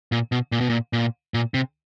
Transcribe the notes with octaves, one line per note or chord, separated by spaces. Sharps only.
A#2
B2
A#2
B2
A#2
A#2
A#2
C3